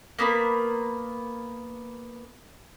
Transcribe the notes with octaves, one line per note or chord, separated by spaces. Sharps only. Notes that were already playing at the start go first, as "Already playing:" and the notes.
A#3 B3 A#4 B5